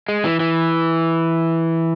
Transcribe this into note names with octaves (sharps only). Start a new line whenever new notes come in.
G#3
E3
E3